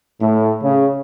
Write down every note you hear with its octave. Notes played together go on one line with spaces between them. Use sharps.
A2
C#3